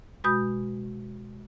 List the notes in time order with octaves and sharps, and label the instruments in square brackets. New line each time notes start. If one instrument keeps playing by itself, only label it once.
[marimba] B2 G#3 F#4 B5 D#6 G6